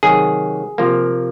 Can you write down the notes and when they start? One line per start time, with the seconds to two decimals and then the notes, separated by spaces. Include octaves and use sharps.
0.03 C3 D#3 F#3 G#4
0.78 C3 F3 A#3